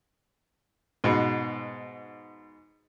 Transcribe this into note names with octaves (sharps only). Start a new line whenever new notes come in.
G#2 B2